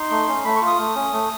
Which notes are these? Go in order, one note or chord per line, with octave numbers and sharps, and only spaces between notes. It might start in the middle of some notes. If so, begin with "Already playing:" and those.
Already playing: D#4 C6
A3
C#4
A3 B5
C#6
F4
D#6
A3
C#4
A3